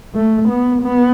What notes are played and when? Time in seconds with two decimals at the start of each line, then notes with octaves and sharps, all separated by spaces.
0.15 A3
0.49 B3
0.82 B3